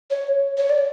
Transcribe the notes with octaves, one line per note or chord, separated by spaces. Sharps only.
C#5
C#5
D5